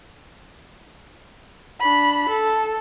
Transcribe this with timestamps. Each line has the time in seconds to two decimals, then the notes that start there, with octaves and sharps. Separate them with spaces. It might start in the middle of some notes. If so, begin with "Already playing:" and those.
1.80 D4 B5
2.28 A4